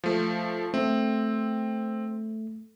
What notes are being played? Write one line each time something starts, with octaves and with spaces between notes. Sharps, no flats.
F3 A3
A3 C4